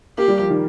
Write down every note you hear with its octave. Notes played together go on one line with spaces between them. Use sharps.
A#3 G4
G3
F3
D#3